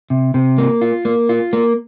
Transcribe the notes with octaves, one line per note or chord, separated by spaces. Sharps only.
C3
C3
A#3
F4
A#3
F4
A#3